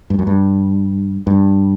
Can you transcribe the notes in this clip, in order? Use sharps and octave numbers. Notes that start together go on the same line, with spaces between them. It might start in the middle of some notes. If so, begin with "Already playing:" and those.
G2
F#2
G2
G2